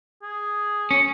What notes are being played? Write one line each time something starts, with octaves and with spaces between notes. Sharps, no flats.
G#4
C#4